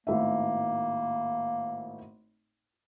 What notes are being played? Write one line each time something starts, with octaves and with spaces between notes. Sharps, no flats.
G#1 A2 A#3 E5